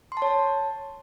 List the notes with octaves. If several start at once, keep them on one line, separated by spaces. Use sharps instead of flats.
C6
A5
C#5
A5